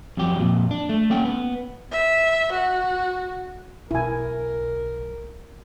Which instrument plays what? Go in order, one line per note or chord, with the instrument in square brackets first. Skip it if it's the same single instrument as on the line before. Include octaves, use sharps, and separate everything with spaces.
[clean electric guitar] F2 F#3 G4
F2 A#2
D4
A3
A#3 C#4 G5
B3
[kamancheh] E5
F#4
[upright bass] B1 [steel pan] E4 G#5 [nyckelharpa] A#4